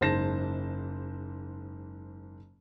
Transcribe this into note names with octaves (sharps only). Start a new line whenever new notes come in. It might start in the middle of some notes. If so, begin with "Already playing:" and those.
F#1 G#2 C5 A5 A#6 E7